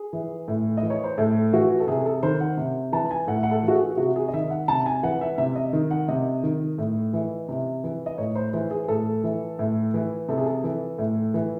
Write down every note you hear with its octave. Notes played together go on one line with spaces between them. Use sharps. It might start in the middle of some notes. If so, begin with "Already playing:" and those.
Already playing: G#4
E3
A2
D#5
E3
C#5
C5
A2 A4
E3 F#4
A4
C3 G#4
A4
D#3 C5
F#5
C3
E3 A5
G#5
A2 F#5
E5
F#5
A4
E3
F#4
G#4
C3 F#4
G#4
D#5
D#3 E5
F#5
C3 A5
G#5
E3 F#5
E5
C3 E5
D#5
D#3
F#5
C3 D#5
D#3
A2
E3
C3
E3
D#5
A2 C#5
C5
E3 C5
G#4
A2 A4
E3
A2
E3
C3 A4
G#4
A4
E3
A2
E3